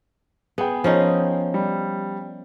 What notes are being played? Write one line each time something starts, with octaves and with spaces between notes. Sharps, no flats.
B3 G#4 G5
F3 C#4 D#4
G3